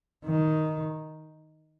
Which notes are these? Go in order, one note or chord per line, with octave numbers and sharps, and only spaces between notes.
D#3